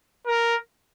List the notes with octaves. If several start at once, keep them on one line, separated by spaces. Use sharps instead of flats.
A#4